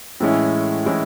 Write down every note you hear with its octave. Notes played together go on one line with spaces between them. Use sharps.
A2 E3 G#3 C#4 E4
A2 E3 G#3 C#4 E4